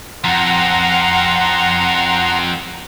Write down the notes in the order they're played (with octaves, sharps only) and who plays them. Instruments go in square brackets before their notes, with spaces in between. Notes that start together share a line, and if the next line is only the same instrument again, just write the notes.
[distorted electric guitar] F2 [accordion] F#5 A#5 C6